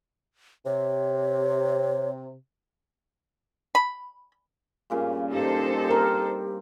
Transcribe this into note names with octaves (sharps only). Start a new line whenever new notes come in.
C3 C#5
B5
G2 A#2 C#3
D#4 G4 A4 C5
C4 A#4